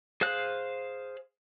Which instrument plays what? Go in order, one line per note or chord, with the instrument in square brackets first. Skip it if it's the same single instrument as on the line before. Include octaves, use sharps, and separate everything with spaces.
[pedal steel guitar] G#4 C5 F5 F#6